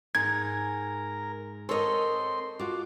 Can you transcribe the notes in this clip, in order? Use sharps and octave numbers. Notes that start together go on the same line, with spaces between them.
G#2 A#4 G#6
C4 A4 A#4 C#5 D#5 C6
F4 F#4 D6